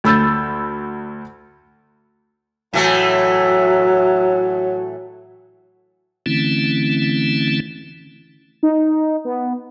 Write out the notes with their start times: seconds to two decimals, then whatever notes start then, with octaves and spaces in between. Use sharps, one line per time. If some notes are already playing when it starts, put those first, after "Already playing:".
0.04 D2 B5 E6 G6 A6
2.74 A2 E3 F#3 A3
6.26 D3 E3 A3 C4 C#4 E4
8.63 D#4
9.25 B3